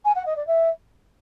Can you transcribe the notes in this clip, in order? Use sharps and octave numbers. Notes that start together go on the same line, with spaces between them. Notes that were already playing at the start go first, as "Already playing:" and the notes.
G#5
F#5
D#5
D5
E5